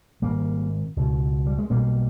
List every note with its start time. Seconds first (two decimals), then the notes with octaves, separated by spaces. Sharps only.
0.22 G#1 G#2 G3 A#3
0.97 C#2 B2
1.47 G3
1.58 G#3
1.70 B1 B2 G3 A#3